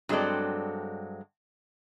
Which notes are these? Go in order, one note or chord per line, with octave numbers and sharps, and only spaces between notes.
G2 F#3 G#3 C4 A4 D5